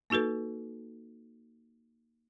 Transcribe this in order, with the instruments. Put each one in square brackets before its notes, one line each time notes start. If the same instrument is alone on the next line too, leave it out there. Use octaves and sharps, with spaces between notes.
[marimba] A#3 D#4 F#4 A4 B4